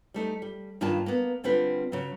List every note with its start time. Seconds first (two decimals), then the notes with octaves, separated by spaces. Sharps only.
0.14 G3 A3 D#4
0.42 G3
0.81 G2 D#3 A#3 F4 A#4 A5
1.06 A#3 B3
1.44 D3 G3 C4 F4 B4
1.92 C#3 F#3